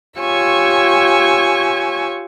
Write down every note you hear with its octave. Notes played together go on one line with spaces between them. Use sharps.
F4 G4 C#5 G#5 C#6 E6